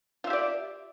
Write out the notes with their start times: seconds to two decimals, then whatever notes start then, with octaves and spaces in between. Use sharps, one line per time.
0.24 F4
0.27 E5
0.30 G4
0.33 D5